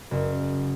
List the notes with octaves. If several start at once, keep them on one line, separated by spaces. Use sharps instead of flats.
F#1